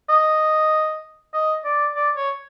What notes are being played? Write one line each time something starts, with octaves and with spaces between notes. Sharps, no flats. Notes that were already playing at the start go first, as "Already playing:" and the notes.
D#5
D#5
D5
D5
C#5